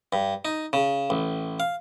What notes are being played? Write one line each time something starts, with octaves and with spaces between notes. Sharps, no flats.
G2
D#4
C#3
A1
F5